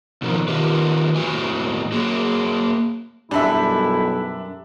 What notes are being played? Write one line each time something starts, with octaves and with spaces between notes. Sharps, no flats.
B2 D#3 F3
D#3 F4 G4 B4
E2 A2 F#4 G#5
A#3 F#4 G#4
B1 F#2 G3 D4 E4 E5